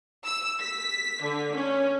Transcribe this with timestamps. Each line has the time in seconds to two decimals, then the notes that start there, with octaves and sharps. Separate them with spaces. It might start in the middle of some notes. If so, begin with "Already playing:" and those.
0.25 E6
0.60 B6
1.22 D3
1.55 C#4